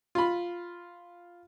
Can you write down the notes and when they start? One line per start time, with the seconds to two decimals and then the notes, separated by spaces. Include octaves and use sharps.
0.15 F4 B5